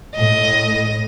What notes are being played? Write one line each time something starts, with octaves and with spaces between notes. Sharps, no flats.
A2 D#5